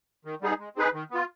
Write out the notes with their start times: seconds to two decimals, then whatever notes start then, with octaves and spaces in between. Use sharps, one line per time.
0.25 D#3
0.42 G3 B3 D#4 G#4
0.59 G#3
0.76 C4 D#4 G#4 B4
0.93 D#3
1.11 B3 F4